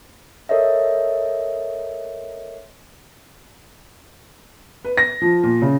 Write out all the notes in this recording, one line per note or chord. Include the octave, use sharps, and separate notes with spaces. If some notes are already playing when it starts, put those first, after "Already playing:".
A4 A#4 C#5 D#5 E5
B4
A#6
F3
A#2
C#3